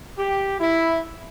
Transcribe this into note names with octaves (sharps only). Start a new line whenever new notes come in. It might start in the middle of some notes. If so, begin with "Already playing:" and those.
G4
E4